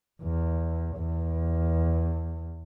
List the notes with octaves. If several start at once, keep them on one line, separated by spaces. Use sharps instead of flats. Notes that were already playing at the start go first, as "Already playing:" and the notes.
E2
E2